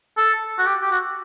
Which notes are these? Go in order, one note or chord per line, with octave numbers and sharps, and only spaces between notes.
A4
F#4
G4
G4
F#4